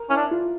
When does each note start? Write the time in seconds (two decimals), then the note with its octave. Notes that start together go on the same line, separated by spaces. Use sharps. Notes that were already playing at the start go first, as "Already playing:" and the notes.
Already playing: A#4
0.10 C#4 E4
0.16 D4
0.31 F4